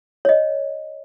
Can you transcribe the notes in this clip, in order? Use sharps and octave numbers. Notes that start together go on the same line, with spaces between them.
C#5 D#5